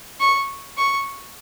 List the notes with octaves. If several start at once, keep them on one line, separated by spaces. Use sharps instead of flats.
C#6
C#6